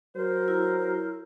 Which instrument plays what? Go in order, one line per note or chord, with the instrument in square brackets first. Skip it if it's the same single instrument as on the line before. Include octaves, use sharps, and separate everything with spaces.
[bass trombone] F#3 [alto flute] A#4 [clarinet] C5
[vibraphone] E4